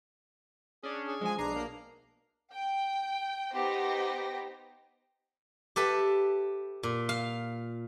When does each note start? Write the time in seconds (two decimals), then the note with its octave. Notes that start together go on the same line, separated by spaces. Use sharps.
0.83 C#4 D4 G#4
1.08 G#4
1.21 F3 G#3 G#5
1.38 B1 G#3 D4 A#5 C7
1.55 A#3
2.52 G5
3.54 B3 D#4 G4 C5 A#6
5.76 G4 A4 B4 E5
6.83 A#2
7.09 F5